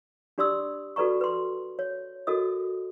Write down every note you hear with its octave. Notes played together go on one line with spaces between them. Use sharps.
D4 G4 D5 C6 D#6 E6
F#4 A4 B4 D5 A#5 C#6
B4 C6
C#5
F#4 A4 A#4 D#5 D#6